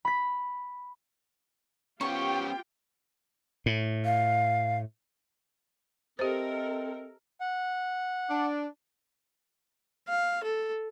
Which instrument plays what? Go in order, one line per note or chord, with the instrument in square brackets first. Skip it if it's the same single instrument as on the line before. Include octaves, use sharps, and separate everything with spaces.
[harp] B5 B6
[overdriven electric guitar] B3 C#4 [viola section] F4 G4 G5 [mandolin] C#6
[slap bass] A2
[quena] F5
[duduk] C4 [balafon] G4 C5 [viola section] A4 A#4 [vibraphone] D#5 E5
[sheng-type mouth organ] F#5
[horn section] D4
[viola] F5
A4